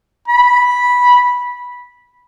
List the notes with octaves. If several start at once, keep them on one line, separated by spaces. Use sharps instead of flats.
B5